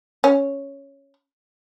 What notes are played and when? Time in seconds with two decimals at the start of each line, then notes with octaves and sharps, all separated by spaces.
0.24 C#4